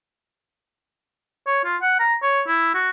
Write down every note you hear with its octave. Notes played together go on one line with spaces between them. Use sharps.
C#5
F4
F#5
A#5
C#5
E4
F#4